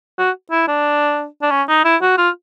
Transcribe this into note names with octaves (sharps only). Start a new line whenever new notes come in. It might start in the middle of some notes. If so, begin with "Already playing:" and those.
F#4
E4
D4
D4
C#4
D#4
E4
F#4
F4